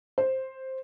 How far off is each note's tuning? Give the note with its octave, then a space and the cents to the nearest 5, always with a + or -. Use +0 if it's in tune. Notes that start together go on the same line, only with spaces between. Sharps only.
C5 +5